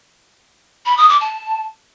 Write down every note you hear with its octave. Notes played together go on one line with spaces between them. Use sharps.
B5
D#6
D6
A5